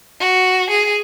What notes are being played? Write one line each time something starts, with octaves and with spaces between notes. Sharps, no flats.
F#4
G#4